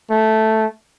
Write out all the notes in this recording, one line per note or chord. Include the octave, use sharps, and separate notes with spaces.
A3